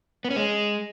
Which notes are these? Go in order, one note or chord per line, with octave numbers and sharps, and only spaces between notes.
B3
C#4
G#3